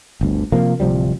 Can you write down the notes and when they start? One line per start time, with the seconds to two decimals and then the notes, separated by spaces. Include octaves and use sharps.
0.21 G1 D2
0.52 C3 F3 A#3
0.80 D1 C3 F3 G3